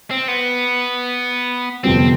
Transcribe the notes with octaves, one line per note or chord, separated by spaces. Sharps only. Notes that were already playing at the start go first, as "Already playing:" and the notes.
C4
B3
G1 F2 C3 G3 B3 C4